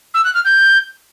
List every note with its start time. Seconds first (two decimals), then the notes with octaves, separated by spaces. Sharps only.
0.14 E6
0.24 F#6
0.35 F6
0.45 G6